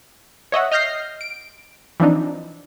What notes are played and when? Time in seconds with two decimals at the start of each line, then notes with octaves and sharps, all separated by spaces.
0.52 C#5 D#5 E5 F#5
0.72 D#5 F6 G6 A#6 C7
1.21 D7
2.00 E3 F3 C4 D4 D#4